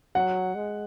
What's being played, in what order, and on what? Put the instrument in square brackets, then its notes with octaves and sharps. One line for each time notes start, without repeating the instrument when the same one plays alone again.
[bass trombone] F#3 [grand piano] F#5
[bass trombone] G#3